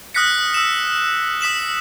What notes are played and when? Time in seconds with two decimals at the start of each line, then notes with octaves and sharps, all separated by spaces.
0.14 D#6 F6 F#6 A#6 B6 C#7
0.54 E6 E7
1.41 D#6 B6 E7 F#7